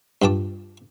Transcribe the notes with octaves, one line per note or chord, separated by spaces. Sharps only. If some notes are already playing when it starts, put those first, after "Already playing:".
G2 F4 G5 A5 D6